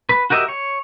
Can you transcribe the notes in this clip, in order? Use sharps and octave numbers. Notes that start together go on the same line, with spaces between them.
B4
F#4 G4 A#4 D#5 E5
C#5